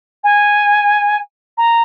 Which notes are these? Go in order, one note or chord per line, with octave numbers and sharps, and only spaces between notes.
G#5
A#5